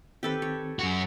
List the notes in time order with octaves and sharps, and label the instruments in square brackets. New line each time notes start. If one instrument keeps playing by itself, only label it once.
[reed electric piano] D#3 C4 [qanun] G4 A4 B4
[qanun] C#5
[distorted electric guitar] F#2 F#4